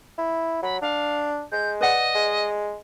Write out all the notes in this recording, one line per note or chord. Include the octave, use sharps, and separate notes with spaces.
E4
F#3 B5
D4 F5
G#3 G6
B4 D5 D#5 F#5
G#3